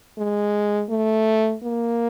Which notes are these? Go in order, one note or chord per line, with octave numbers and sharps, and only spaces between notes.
G#3
A3
A#3